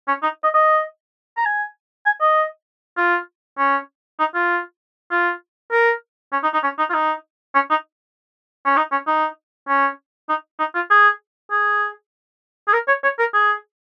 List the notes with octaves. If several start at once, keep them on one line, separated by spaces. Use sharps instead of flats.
C#4
D#4
D#5
D#5
A#5
G#5
G#5
D#5
F4
C#4
D#4
F4
F4
A#4
C#4
D#4
D#4
C#4
D#4
F4
D#4
C#4
D#4
C#4
D#4
C#4
D#4
C#4
D#4
D#4
F4
G#4
G#4
G#4
A#4
C#5
C#5
A#4
G#4